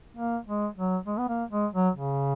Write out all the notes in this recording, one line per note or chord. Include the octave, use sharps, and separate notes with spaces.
A#3
G#3
F#3
G#3
B3
A#3
G#3
F#3
C#3